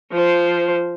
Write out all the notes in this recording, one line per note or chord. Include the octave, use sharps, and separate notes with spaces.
F3 C5